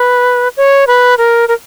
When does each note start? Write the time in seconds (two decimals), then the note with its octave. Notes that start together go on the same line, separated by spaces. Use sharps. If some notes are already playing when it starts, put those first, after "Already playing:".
Already playing: B4
0.57 C#5
0.87 B4
1.18 A#4
1.48 A#4